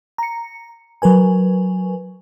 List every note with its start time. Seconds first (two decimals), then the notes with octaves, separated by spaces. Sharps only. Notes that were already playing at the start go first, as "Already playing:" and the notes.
0.18 A#5 C#7
1.02 F#3 A#4 B4 G#5